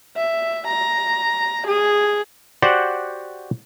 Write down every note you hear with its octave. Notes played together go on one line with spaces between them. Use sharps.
E5
A#5
G#4
F#4 G4 C5 D5 F#5